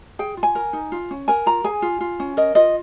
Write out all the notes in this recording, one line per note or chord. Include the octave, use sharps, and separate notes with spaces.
G#4 G5
F4
G#5
A#4
D#4
F4
C#4
A#4 G#5
F4 A#5
G#4 G#5
F4
F4
C#4
A#4 D#5
F4 D#5